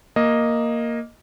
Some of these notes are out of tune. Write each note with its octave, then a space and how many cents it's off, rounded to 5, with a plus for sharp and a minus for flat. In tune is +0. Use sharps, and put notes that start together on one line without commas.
A#3 +0 D#5 +0